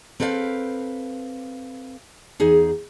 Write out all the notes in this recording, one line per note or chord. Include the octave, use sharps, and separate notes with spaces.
C4 A4 B4 D#5 F5 G5
E2 D#4 G#4